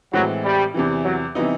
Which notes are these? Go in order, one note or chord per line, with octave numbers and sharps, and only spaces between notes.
A2 E3 F#3 G#3 C4
G3
E2 C3 E3
F#3
C3 E3 G3 B3 D#4